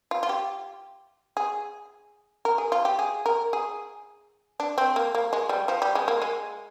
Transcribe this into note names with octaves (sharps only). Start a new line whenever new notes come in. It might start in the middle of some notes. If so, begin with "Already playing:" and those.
F4
F4
G4
G#4
A#4
G#4
F4
G4
G#4
A#4
G#4
D4
C4
A#3
A#3
G#3
G3
F3
G3
G#3
A#3
G#3